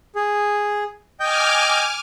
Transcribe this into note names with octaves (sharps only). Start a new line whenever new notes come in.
G#4
D#5 G5 G#5 D6 F6 G6